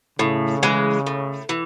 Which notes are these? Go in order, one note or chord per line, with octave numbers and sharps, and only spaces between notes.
A2 C#3
E3 G#3
A2
E3